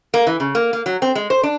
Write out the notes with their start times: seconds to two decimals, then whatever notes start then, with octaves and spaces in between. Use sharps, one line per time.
0.14 A#3
0.27 E3
0.40 C#3
0.55 A#3
0.73 A#3
0.86 F#3
1.02 C4
1.15 G#3
1.30 C5
1.43 D4